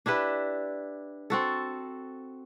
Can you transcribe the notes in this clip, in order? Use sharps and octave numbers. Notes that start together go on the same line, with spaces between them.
D4 E4 G4 B4
C4 F#4 A4